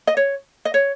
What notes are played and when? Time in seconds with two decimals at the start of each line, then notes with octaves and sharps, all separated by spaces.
0.07 D#5
0.17 C#5
0.65 D#5
0.74 C#5